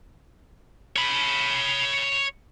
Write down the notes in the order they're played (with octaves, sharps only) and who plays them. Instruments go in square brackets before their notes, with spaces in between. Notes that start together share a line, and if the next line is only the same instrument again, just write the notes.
[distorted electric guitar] C#5 B5